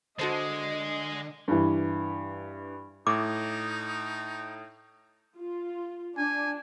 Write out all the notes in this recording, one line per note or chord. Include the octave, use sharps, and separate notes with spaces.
D3 G#3 F#4 A4 C5 D#5
G2 E3
A2 D#4 D6
F4
D4 G#5